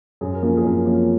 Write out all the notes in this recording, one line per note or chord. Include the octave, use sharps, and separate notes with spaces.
F#2 G#4
A#4
F3 A#3 C#4
A#4
G#4
F#2 A#4
F3 A#3 C#4